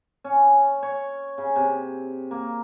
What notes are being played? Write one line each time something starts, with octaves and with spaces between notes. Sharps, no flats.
C#4
C#5
C#3
C3
A#3